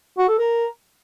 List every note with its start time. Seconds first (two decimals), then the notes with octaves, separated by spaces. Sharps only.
0.18 F#4
0.28 A4
0.39 A#4